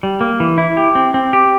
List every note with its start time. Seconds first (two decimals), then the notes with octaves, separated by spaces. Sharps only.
0.03 G3
0.21 A#3
0.40 E3
0.58 E4
0.77 G4
0.95 C4
1.14 C4
1.33 G4